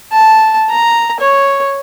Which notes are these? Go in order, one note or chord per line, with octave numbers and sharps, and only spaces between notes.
A5
A#5
C#5